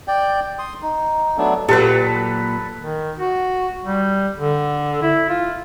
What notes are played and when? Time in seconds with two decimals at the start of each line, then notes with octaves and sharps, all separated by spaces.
0.08 D5 G5
0.59 C6 D#6
0.82 D#4
1.38 F#3 A3 B3 D4
1.69 A#2 F#3 G4 A4 B4
2.79 D#3
3.17 F#4
3.84 G3
4.37 D3
5.02 E4
5.29 F4